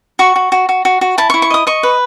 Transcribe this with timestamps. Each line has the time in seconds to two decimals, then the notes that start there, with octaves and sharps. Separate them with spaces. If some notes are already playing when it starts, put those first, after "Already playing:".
0.19 F#4 C#6
0.36 F#4
0.52 F#4
0.69 F#4
0.85 F#4
1.01 F#4
1.18 E4 A5
1.30 C#6
1.34 E4
1.42 C#6
1.50 D#5 D#6
1.67 D#5 C#6
1.83 B4